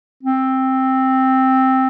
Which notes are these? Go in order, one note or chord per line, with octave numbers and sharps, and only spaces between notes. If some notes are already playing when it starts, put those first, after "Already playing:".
C4